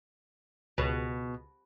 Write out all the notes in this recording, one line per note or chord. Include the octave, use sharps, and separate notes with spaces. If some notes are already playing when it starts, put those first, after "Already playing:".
C#2 B2